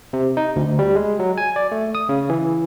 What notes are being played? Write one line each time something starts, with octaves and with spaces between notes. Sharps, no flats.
C3
D#4
D2
G3
G#3
F#3
G#5
D5
A3
D#6
C#3
E3